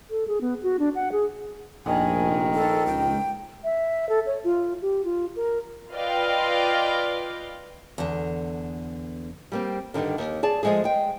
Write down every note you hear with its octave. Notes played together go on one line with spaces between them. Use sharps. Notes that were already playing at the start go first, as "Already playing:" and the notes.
A4
G#4
B3
F#4
D4
F#5
G#4
F1 A#1 D#3 G#5
A4
C#2 G5
E5
A4
C#5
F4
G4
F4
A#4
F4 B4 D5 D#5 F5 G5
E2 D3
G3 A#3 C4
G2 A#2 D3 D#3
D#2
G#4 D5 A5
F3 F#3 G#3 A3 G#4
G#3 G5